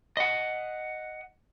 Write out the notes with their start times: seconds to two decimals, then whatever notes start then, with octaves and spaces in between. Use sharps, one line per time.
0.17 D#5 F#5